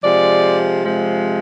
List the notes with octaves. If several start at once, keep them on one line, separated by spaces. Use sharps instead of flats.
C3 F3 G#3 D5
C3 F3 G#3